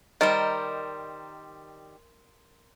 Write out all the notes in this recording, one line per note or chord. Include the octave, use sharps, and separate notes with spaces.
D#3 G3 A#4 C5 D#5